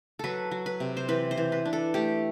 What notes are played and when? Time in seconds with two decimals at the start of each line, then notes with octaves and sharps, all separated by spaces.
0.19 F#3 A4 B4
0.51 F#3
0.66 B4
0.80 C3
0.97 C5
1.08 E3 B4
1.31 C5
1.37 E3
1.52 B4
1.65 D4
1.73 A4
1.94 A3 G4